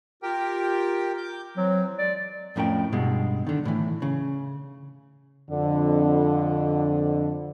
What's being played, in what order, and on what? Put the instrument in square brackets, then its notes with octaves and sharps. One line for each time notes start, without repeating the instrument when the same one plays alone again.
[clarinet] F4 [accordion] G4 A#4 G5
[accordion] D6 G6
[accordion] E3 C4 [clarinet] F#3
[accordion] G#3 [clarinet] D5
[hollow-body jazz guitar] F2 A2 C#4 A#4 G5
G2 B2 G#3
D3 D#3
A2 E3
C#3
[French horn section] F2 D3